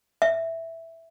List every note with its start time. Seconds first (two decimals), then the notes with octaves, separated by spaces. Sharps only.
0.22 E5